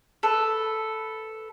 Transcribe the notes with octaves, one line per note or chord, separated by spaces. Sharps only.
A4 B4